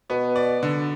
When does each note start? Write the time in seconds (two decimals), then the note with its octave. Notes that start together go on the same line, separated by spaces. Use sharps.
0.10 B2 B3
0.36 D5
0.63 D3